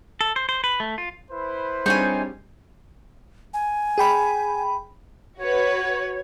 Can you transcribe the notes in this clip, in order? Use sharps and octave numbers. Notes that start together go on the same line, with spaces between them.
A4
C5
C5
B4
A3
F4
E4 B4 C5
G3 C4 D4 D#4 F4 G#4 C#5 G#5
G#5
G#4 G5 B5
F#4 B4 C#5